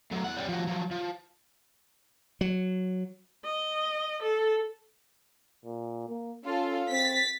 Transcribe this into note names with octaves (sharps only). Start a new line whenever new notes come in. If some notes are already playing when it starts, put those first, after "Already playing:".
A2 F#3
E2 F#5
G3 C#4
F3 F#4
F3 F#3
F3
F#3
D#5
A4
A#2
A#3
C#4 F4 A4
C4 A6 B6